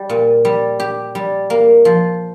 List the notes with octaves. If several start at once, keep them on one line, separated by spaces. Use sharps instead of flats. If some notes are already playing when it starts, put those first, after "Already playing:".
Already playing: G3
A#2
G3
G4
G3
A#3
F3